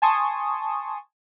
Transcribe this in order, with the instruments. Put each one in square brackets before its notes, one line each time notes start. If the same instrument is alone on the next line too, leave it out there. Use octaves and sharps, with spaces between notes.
[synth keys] G#5 A5 C6 C#6 D#6